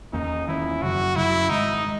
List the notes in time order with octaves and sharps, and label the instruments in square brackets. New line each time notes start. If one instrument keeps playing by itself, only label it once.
[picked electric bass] E2 D#3 A#3 C#4 [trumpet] D#4
[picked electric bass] E2 D#3 A#3 C#4 [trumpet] E4
[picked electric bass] F#2 C#3 F#3 [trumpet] F#4
[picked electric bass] F#2 C#3 F#3 [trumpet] E4
[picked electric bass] G#2 D#3 G#3 [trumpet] D#4
[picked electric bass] G#3